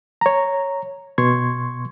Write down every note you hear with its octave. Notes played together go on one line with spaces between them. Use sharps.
C#5 A#5
B2 C6 C#6 G#6